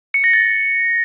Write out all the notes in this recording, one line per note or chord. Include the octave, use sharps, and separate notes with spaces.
C#7
A#6
A6